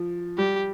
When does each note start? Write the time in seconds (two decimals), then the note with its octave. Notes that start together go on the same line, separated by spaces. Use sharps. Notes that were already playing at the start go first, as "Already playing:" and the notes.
Already playing: F3
0.38 G3 G4